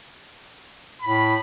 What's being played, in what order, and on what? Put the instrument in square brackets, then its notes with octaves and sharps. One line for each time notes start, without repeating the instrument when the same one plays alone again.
[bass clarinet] A2 [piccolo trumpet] B5